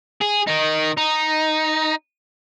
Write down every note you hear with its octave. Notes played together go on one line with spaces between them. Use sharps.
G#4
D#3 D#4
D#4